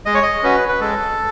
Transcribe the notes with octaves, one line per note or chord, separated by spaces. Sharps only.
G#3 D#5
C#5
D#5
C#4 F#4 B4
B4
G#3 A4